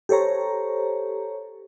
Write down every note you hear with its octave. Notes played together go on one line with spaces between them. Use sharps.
G4 A4 C5 C#5 A#5